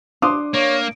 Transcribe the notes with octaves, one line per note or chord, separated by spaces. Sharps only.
D4 C6 D6 D#6
A#3 C#5